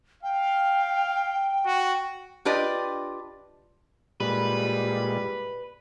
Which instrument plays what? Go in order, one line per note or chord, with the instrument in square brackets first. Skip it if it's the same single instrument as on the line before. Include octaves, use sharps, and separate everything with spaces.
[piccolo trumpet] F5 [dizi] G5
[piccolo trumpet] F#4
[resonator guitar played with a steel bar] D4 F4 G4 B4 D5 D#5
[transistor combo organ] A#2 G#3 [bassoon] G3 [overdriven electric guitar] B4